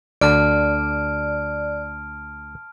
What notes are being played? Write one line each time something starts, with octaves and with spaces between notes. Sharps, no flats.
D2 D3 D5 A5 F6 D7